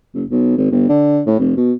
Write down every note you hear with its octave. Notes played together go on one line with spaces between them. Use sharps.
F#1
B1
G#1
G1
D3
A2
F1
B2